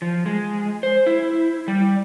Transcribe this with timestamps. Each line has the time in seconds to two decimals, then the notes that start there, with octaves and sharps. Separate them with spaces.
0.02 F3
0.26 G#3
0.83 C5
1.06 E4
1.68 G3